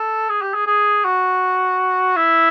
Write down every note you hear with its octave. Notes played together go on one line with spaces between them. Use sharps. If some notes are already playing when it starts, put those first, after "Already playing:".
Already playing: A4
G#4
G4
G#4
G#4
F#4
E4